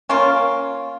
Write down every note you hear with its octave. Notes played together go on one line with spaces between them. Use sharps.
A#3 C#4 F4